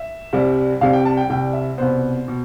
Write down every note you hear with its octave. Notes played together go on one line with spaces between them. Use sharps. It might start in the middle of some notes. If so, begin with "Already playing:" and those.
Already playing: E5
C2 C3 G3
C2 C3 G3 F5
G5
A5
G5
C2 C3 G3 G5
E5
C2 B2 B3 C5
B2